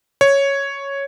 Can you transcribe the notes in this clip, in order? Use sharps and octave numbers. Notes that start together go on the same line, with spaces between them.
C#5